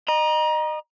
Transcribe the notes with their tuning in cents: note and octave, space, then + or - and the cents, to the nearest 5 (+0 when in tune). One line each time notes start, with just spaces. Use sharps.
D#5 -25 A#5 +30